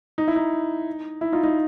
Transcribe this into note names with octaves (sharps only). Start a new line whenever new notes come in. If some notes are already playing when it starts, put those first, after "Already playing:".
D#4
E4
D#4
E4
D#4 F4
D#4 F4